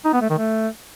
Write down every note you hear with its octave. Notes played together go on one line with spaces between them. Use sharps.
D#4
B3
A3
D#3
A3